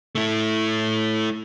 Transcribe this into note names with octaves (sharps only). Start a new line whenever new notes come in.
A3 E4